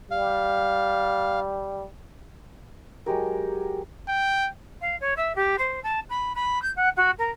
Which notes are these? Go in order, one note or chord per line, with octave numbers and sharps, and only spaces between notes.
G3 F5
F#3 G#3 G4 A#4
G5
F5
C#5
E5
G4
C5
A5
B5
B5
G6
F#5
F#4
A#4